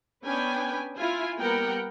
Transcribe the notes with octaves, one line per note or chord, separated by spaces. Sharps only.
B3 C#4 D4 B4 G5 G#5
E4 F4 G#5
G3 A#3 B3 A#4 F#5 G5